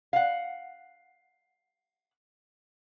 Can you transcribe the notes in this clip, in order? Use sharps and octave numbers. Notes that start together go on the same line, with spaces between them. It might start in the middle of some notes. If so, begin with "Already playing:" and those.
F5 F#5